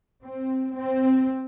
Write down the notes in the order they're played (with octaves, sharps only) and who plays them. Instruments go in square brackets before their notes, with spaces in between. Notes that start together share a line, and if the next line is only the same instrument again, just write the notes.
[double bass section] C4
C4